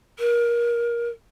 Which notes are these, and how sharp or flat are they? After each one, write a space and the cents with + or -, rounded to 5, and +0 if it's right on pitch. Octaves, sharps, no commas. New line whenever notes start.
A#4 +20